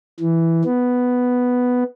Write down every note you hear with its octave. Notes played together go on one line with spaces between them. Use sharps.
E3
B3